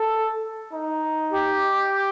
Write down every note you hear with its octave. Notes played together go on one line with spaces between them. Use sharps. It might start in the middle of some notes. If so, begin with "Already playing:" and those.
Already playing: A4
D#4
G4